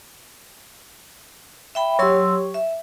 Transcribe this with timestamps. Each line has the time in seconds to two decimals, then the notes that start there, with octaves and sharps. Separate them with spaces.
1.75 E5 G5 B5
1.99 F#3 G4 C#5 C6 E6
2.54 E5